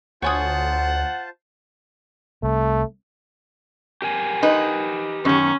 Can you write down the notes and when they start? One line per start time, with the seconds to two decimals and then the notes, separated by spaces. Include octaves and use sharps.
0.22 D2 F4 C5 C#5 F#5 G#5 A5 D#6
2.43 C2 A3
4.02 G4 A#4 G#5
4.43 D#4 B4
5.25 F#2 D#3 C#4